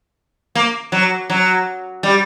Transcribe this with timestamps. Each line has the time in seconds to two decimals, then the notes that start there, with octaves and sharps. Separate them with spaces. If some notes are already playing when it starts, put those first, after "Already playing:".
0.55 A#3
0.92 F#3
1.30 F#3
2.03 G3